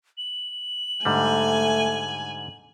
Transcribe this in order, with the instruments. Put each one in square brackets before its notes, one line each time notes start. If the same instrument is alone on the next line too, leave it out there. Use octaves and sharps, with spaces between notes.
[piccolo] F#7
[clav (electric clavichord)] G#2 D3 G3 [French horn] A3 [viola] G#5